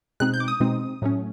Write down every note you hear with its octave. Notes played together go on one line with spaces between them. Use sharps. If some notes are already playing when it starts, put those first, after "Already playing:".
B2 G#3 C4 D#4 F#6
G6
D6
D#6
B2 G#3 C4 D#4
A2 F#3 A3 C#4